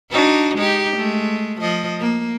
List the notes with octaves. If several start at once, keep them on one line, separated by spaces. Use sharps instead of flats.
D4 D#4 F#4
G#3 D#4 G4
G#3 A3
F3 D#5
A#3